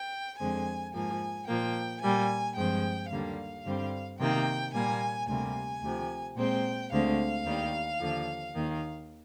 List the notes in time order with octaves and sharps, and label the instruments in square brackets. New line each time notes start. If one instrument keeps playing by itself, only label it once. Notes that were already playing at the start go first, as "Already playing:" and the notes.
Already playing: [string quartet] G5
F2 D3 G#3 C4 G#5
G#2 F3 A#3 G#5
A#2 F3 A#3 G5
A#2 G3 A#3 G#5
G2 F3 G#3 C4 G5
D#2 D3 G3 A#3 F5
G2 D3 G3 C4
C3 D#3 A#3 G5
A#2 G3 A#3 G#5
D2 C3 G3 A#3 G#5
D2 C3 F3
A#2 G#3 C4 G5
D2 D3 G#3 C4 F5
D#2 D#3 G3
D#2 D3 F3
D#2 D#3 A#3